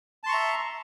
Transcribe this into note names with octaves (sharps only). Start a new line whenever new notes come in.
E5 A5 A#5 C6 C#6